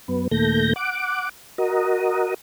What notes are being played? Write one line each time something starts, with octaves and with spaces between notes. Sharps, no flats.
F#2 B3
D#2 A#2 A3 G6 A#6
F#5 D6
F#4 A#4 D#5